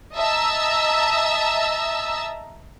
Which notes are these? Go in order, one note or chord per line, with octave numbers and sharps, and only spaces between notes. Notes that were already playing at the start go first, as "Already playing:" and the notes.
D#5 E5 A5 A#5 E6